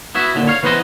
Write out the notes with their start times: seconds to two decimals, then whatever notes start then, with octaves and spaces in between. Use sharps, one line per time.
0.15 B3 E4 F#4 E5
0.35 D#2 A#2 D3
0.48 C#5 F5
0.63 E3 B3 B4 C5 D#5